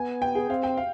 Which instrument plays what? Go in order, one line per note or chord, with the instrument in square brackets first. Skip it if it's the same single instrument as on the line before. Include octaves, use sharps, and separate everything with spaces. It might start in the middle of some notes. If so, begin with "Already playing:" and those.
Already playing: [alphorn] B3 [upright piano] G#5
[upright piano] G5
G#4
[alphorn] C4 [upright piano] F5
[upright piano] G5
F5